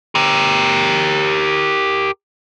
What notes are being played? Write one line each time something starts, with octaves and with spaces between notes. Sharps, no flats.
G4 A#4